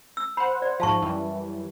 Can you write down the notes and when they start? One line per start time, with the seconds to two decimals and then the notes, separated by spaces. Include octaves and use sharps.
0.17 E6
0.37 C5 F#5 B5
0.62 D5
0.80 G#2 F3 F5 A5 C#6
1.02 F#2 E3 G3